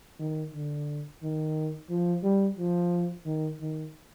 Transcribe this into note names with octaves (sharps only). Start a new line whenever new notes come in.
D#3
D3
D#3
F3
G3
F3
D#3
D#3